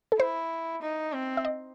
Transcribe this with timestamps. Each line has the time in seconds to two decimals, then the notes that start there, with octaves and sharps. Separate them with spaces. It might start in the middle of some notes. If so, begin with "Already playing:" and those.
0.12 A4
0.19 E4 C5
0.82 D#4
1.13 C4
1.37 E5
1.45 D#5